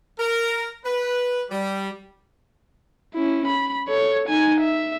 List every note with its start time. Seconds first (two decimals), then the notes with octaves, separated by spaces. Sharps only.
0.20 A#4
0.84 B4
1.50 G3
3.14 C#4 E4
3.48 B5
3.88 A4 C#5
4.28 D#4 G#5
4.61 E5